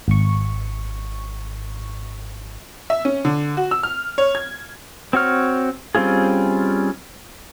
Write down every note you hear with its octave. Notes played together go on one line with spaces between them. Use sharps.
G#1 C#6
E5
C#4
D3
F#4
E6
F6
C#5
G#6
C4 F#4 C#5 F6
G3 C4 C#4 F4 G#4